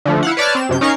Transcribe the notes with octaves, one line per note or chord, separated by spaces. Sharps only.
D3 F3 A3
E4 F5 F#5
B4 C#5 D5 A5 D6 F6
C4 E7
F#2 C3 G6
C#4 D#4 A#4 F5 C#6 C7